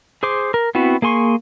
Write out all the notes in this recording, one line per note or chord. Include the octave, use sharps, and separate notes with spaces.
G#4 C5 C6 D6
A#4
B3 C4 E4 F#4
A#3 G#4 G#5 C6 C#6